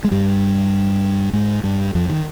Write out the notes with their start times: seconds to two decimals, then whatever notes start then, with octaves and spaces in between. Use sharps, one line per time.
0.04 G#3
0.11 G2 G3
1.33 G#2 G#3
1.63 G2 G3
1.95 F2 F3
2.09 D#3